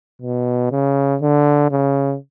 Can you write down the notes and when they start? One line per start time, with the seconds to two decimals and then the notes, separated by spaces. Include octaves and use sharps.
0.22 B2
0.72 C#3
1.21 D3
1.71 C#3